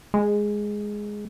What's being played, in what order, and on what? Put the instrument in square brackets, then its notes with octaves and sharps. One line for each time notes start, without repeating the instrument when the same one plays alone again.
[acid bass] G#3